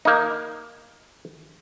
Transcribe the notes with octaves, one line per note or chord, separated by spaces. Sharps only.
A#3 D#4